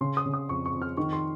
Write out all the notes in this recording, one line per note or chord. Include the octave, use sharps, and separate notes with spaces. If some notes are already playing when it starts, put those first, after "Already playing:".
C#3 C6
D#6
C#3
D#6
F2 C#6
C#6
F2
F6
D#3 C#6
C6